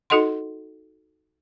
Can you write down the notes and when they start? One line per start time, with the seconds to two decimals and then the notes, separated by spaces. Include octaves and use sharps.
0.10 D#4 F#4 A4 D#5 F#5 C6